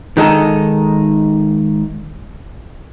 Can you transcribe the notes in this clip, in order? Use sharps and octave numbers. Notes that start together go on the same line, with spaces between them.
D#3 G#3 D#4 A4